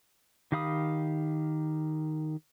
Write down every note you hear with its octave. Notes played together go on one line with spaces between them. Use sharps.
D#3 G4 F5 B5 D#6